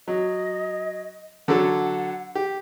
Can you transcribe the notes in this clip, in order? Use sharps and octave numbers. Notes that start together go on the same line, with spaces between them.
F#3 D#5
D3 F#3 A4 F#5
G4